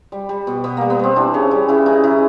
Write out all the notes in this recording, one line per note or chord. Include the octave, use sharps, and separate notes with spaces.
G3
G3
B2
B2 B3
G3 A#3
B3
G3 C4
E3 D4
C#3 C#4
G3
C#3 E4
E3 D#4
C#3 E4